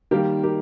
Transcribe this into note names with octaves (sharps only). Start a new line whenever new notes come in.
D#3 G3 A#3 G4 A#4
G4 A#4